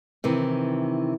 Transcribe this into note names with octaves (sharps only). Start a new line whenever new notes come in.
C3 D#3 E3